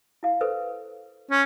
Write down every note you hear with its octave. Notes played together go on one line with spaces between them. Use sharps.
E4 F5
A4 B4 C5
C#4